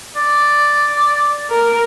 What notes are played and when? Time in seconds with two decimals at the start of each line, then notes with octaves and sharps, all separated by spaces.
0.17 D5
1.51 A#4